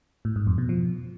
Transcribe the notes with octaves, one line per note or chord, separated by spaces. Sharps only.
A2
G#2
F2
B2
F3